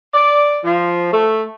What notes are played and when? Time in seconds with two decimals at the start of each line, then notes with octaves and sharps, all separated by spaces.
0.13 D5
0.64 F3
1.12 A3